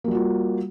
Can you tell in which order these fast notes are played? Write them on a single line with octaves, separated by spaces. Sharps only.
A#3 G3 F#4 F4